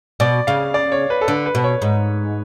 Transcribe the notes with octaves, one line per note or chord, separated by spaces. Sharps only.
B2 D5
C#3 F5
D5
C#5
B4
A4
D3 B4
B4
B2
C#5
G#2